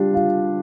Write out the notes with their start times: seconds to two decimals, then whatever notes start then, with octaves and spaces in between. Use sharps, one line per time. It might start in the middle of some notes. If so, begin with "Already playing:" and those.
Already playing: G3 D4 F4
0.14 F4